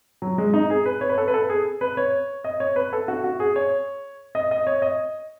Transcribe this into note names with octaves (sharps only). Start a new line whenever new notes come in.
F#3
G#3
D#4
G#4
B4
C#5
B4
A4
B4
A4
G#4
B4
C#5
D#5
C#5
B4
A4
F#4
F#4
G#4
C#5
D#5
D#5
C#5
D#5